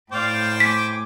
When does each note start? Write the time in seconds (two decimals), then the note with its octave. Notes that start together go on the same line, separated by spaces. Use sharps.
0.12 A2 C5 D5 F5 G5
0.60 G#5 D6 B6